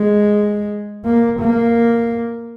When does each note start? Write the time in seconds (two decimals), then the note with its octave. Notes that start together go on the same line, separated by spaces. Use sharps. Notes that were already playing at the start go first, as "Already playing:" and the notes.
Already playing: G#3
1.05 A#3
1.40 A#3